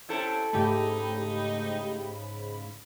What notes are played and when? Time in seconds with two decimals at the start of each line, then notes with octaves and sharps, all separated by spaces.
0.09 C3 C4 C#4 E4 A4
0.53 G#2 C#3 A3 D#4 G4 B5